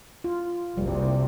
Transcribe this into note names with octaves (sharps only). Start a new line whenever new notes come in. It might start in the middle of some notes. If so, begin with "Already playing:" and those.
F4
F#1 C2 C3 G3